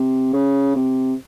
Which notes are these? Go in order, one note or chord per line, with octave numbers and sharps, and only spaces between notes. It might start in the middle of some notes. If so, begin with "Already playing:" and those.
Already playing: C3
C#3
C3